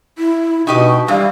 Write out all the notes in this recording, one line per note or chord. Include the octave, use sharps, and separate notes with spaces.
E4
B2 D#4 G4 D#5 C#6
G2 E3 G3 F5